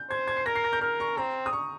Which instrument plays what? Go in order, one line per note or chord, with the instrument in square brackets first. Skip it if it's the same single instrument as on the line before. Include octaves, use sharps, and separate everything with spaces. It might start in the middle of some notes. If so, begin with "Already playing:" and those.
Already playing: [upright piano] G6
[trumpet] C5 [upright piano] G#6
[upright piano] G#6
C7
[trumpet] A#4 [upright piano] A#6
[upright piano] C7
A#6
G6
[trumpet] A#4 [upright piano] F6
[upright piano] C#6
[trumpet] C4 [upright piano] A#5
[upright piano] D#6
C#6